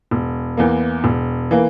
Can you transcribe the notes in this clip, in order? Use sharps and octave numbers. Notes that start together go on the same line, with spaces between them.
E1
E2 E3 A#3
E1
E3 A#3